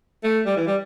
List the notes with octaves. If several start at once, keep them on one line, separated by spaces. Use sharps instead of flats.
A3
G3
E3
G3